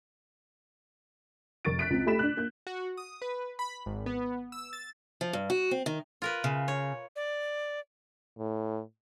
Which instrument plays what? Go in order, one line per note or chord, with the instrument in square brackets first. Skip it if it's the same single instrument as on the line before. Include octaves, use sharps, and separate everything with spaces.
[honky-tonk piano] F1 A#4 C#6 A6 D7
F#6 B6 D7
C#2 C4
A3 G4 B5 B6 E7
D4 F#6
A#3 G6
[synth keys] F#4
D#6
B4
B5
G#1
B3
E6
A6
[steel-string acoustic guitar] F3
G2
F#4
C4
D#3
[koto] F4 A#4 B4
[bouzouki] C#3
[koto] C#5
[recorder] D5
[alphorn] A2